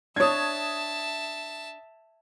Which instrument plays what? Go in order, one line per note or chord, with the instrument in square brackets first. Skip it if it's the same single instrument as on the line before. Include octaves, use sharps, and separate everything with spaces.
[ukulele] D4 C#5 [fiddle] E5 A5 [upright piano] D#6 G#6